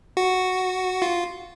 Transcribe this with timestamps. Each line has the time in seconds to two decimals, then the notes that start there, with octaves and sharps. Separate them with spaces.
0.17 F#4
1.02 F4